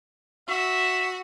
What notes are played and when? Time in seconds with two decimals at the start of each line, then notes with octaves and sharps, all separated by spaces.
0.49 F#4 E5